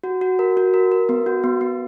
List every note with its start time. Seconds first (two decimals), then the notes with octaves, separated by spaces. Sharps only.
0.04 F#4
0.21 F#4
0.39 A#4
0.57 F#4
0.74 A#4
0.92 A#4
1.09 B3
1.26 F#4
1.44 B3
1.61 B3